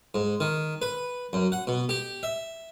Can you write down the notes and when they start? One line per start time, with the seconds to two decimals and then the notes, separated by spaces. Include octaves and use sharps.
0.14 G#2
0.40 D#3
0.82 B4
1.33 F#2
1.52 F#5
1.67 B2
1.89 G4
2.23 E5